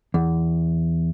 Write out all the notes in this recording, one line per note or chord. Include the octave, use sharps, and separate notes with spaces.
E2